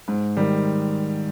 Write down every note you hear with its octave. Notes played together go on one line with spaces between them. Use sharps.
G#2
D#3 G3